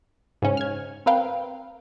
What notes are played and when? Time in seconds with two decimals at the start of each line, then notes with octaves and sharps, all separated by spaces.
0.42 G#2 C#3 C#4
0.57 F6 G#6
1.06 C4 A#4 B4 F5 G5